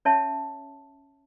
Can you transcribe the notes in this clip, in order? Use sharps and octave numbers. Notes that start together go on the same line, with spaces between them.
C#4 C#5 E5 A5